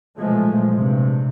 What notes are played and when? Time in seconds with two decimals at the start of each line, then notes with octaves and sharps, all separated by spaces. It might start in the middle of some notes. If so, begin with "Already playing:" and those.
0.18 B1 A#2 F3 G#3 A3
0.72 G2 C3